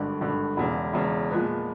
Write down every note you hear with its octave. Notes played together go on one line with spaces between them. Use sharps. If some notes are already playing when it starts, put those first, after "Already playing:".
Already playing: G#1 G2 D3
G#1 G2 D3
E1 E2 C#3
E1 E2 C#3
A#2 F3 G#3 B3